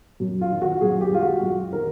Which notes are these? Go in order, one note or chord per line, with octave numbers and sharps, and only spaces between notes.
F#2
F4
D#3
F#4
F#2 G#4
G4
G#3 F4
F#4
F#2
D#3 A#4